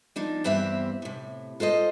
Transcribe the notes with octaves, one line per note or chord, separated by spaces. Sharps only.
F3 D4 D#4
E2 G2 C4 G4 E5
A2 C3
F4 A4 C5 D#5